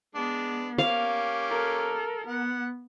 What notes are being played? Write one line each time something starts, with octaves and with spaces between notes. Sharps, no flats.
G#3 B3 D4
A#3 C#4 G4 F5
A4 A#4
B3 F#5